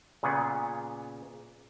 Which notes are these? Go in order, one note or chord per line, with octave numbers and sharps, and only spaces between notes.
A#2 C#3 B3 G#4 F#5